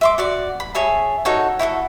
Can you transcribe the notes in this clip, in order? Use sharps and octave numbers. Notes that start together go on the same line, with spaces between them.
E5 C6 D6
F#4 D5 D6
B5
G#4 C#5 E5 A5
D#4 F#4 A4 C#5
E4 F#4 G4 A4